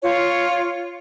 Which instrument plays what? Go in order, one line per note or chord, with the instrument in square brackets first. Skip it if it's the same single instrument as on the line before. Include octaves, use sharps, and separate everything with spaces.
[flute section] F4 C#5